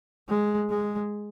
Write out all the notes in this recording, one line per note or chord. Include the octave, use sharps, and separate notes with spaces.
G#3
G#3